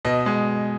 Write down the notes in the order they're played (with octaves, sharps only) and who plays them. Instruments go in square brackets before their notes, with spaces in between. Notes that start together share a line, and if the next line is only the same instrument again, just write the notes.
[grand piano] B2 D#5
G#3